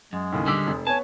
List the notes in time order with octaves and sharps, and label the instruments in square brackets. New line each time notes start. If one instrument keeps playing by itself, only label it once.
[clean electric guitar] F#2 [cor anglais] G#3
[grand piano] D#2 A2 C#3
[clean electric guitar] D3 G3 [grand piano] D6 E6 B6
[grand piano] F1
[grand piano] B3 C#5 [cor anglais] G#5 [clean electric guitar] A5